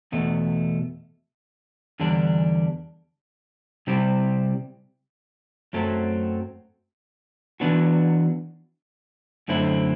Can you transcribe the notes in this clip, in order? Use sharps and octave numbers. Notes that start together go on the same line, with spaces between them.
E2 B2 A3
E2 D3 G3 D4
C3 G3 C4 E4 G4
F#2 F#3 A3 C4
E3 B3 D4 F#4
F#2 D3 A3 C4 E4